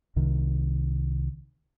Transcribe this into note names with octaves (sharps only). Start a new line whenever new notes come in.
C2 C3 D#3